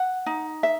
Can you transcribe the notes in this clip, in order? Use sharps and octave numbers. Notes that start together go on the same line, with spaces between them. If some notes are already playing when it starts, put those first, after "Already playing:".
Already playing: F#5
D#4
E5